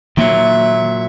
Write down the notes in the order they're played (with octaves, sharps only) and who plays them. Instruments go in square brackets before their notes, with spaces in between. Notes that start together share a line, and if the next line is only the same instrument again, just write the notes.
[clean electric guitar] A#2 F#3 [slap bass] D#3 A#3 [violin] E5